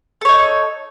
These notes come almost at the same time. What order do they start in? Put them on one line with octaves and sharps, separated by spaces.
A4 C#5 D#4